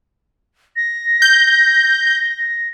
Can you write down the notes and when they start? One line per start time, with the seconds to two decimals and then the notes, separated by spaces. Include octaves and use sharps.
0.76 A#6
1.22 G6